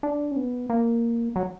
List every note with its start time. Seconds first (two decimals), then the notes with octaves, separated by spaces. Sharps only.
0.03 D4
0.31 C#4
0.37 B3
0.70 A#3
1.36 F#3